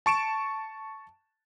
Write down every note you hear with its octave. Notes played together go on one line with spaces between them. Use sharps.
A5 C#6 D7 E7